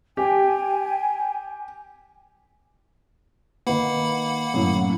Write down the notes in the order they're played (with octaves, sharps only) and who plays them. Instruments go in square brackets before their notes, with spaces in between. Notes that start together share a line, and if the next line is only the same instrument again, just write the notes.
[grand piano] G4 [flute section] G5 G#5
[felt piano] D#3 B4 [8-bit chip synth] A#3 F#5 B5
[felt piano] F#2 A2